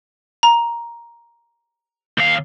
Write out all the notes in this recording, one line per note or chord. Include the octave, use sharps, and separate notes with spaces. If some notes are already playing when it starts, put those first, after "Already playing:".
A#5
D#2 F5